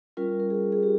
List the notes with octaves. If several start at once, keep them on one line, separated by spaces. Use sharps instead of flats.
G3 C#4 F4 A#4
A#4
G#4
G#4
G4